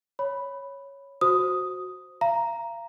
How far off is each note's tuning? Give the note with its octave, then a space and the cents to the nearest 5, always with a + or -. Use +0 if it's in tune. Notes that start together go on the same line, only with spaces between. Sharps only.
C#5 +0 B5 +0
F#4 -5 C5 +0 D#6 +0
F5 -35 A#5 +0